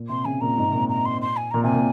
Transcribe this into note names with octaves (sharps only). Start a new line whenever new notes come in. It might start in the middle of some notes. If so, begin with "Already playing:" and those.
Already playing: A#2
C3 C6
C#3 G#5
A#2 A#5
G#2
C3
A#2
A#5
C6
C6
G#5
A#2 A#5
C3 G#5
A#2